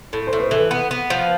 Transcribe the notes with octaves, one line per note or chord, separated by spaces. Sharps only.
A2
C5
A2
B4
E3 A4
B3
B3
F3